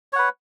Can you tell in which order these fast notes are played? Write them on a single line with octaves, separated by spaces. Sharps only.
C#5 F#5 B4